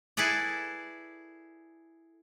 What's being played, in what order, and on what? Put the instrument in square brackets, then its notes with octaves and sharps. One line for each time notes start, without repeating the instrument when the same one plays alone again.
[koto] E4 G#4 A4 B4 D5